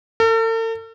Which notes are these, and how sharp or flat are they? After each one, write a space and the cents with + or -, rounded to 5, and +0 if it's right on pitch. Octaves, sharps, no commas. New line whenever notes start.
A4 +45